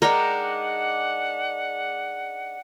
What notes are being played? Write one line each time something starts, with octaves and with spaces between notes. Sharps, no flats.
G#3 D4 D#4 A#4 F#5 G5